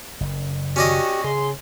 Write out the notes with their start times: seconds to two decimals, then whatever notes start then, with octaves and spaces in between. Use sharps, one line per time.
0.20 F#1
0.76 C#4 F#4 G4 D5 D#5
1.24 C#3 G#4 C6